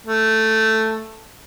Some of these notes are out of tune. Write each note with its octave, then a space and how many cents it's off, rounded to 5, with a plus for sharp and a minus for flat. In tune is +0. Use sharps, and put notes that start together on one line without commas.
A3 +5